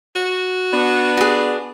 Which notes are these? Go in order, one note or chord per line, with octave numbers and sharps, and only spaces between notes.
F#4
B3 D4
F#4 G#4